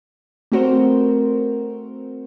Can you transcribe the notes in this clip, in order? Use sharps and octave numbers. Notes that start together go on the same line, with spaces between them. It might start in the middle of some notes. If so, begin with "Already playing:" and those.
A3 C4 F#4 A#4 C5